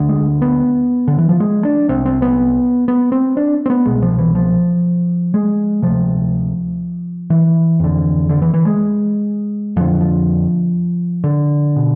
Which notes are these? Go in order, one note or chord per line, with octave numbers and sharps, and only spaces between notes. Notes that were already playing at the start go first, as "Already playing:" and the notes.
Already playing: D2 D3
G#3
B3
D3
E3
F3
G#3
D4
C2 C3 C4
C4
B3
B3
C4
D4
C4
B3
C2 B2 G#3
F3
E3
F3
G#3
D2 C3 F3
E3
F2 D3
D3
E3
E3
G#3
F2 D3 F3
F3
D3
B2